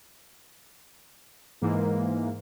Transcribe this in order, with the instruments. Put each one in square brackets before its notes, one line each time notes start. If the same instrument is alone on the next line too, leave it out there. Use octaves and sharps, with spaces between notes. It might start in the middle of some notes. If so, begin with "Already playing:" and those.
[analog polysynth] G#2 E3 A#3